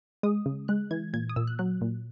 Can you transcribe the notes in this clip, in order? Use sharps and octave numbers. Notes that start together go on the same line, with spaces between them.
G#3 D#6
C#3
G#3 F#6
E3 G#6
A#2 G#6
D#6
A#2 E6
F#6
F#3 F#6
A#2